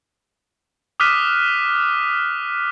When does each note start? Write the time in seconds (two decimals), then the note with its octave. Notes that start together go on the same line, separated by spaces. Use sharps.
1.00 D6 D#6 F6 F#6 B6 D#7